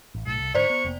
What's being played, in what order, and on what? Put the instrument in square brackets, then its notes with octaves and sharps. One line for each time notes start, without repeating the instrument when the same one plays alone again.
[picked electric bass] A1
[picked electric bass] B1 A2 [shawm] A4
[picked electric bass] C2
[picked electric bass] G#2 D3 [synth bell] C5 D5 [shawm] C#6
[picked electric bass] B3
F1 A#3 B3